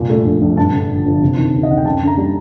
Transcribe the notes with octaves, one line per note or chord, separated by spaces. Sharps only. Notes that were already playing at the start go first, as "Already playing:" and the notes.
Already playing: C2 A#2
A3
A#1
A#1
G2 A5
D3
G1
G1
C3
D#3
D2
D#5
D2 F#5
G5
F#2 A5
D3
A#5
G3